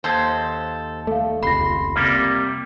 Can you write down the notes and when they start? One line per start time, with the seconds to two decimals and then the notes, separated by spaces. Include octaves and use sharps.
0.04 D#2 A4 C5
1.07 A3 A4 F5
1.43 F1 C#2 B5 C6 A#6
1.96 C3 G3 A#3 F6 A6